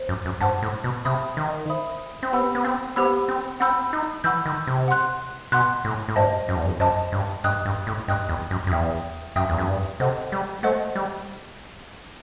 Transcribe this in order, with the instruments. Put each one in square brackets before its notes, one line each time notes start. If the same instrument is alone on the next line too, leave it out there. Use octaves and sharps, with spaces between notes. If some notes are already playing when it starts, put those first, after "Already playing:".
Already playing: [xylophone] C5
[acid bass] F#2
F#2
[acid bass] G2 [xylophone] C5 F#5 A5
[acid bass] A2
B2
[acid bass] C3 [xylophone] C5 E5 B5 D#6
[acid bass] D#3
[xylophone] C5 E5 B5 D#6
[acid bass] C4
[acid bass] B3 [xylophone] G4 C5 F#5 B5 E6
[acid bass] B3
C4
[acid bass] B3 [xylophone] G4 C5 F#5 B5 E6
[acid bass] C4
[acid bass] C4 [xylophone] F#5 B5 E6 G6
[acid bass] D#4
[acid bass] E3 [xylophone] F#5 B5 E6 G6
[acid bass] D#3
C3
[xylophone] F#5 C6 F#6
[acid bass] B2 [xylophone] F#5 C6 F#6
[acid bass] A2
A2
[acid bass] G2 [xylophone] C5 D#5 A5
[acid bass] F#2
E2
F#2
[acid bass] F#2 [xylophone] C5 D#5 A5
[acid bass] G2
[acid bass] G2 [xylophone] D#5 G5 D#6 F#6
[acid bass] G2
A2
[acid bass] G2 [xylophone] D#5 G5 D#6 F#6
[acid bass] E2
F#2
F#2
[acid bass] E2 [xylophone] E5 G5 D#6
[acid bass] F#2 [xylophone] E5 G5 D#6
[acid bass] E2
F#2
G2
[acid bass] C3 [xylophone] A4 C5 D#5 F#5
[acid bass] G3
[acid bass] A3 [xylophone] A4 C5 D#5 F#5
[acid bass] G3